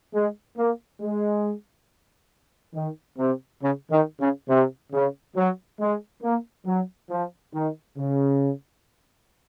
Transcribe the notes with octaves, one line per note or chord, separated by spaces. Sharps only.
G#3
A#3
G#3
D#3
C3
C#3
D#3
C#3
C3
C#3
F#3
G#3
A#3
F#3
F3
D#3
C#3